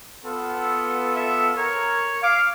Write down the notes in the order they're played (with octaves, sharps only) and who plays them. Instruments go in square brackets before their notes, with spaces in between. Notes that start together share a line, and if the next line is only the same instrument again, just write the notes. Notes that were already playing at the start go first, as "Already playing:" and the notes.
[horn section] B3 F4 A4
[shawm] E5
[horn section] A#4 [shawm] C#5
[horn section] F5 [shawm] D6